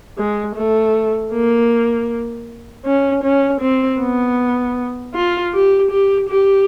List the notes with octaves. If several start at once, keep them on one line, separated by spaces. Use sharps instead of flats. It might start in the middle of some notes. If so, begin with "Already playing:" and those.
G#3
A3
A#3
C#4
C#4
C4
B3
F4
G4
G4
G4